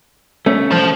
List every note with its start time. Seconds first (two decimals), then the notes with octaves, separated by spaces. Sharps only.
0.46 A3 C#4
0.71 C5 A5